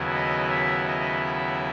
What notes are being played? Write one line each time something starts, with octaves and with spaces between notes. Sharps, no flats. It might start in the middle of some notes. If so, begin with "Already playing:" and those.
Already playing: D#2 C#3 F#3 B3 E4
D#5
E5
D#5
E5